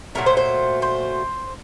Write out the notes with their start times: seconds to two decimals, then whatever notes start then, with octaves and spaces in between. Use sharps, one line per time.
0.15 A#2 F#3 A3 A#4
0.26 C5
0.37 C5
0.82 C5